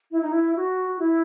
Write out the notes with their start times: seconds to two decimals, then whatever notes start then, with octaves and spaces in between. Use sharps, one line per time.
0.11 E4
0.22 D#4
0.31 E4
0.56 F#4
0.99 E4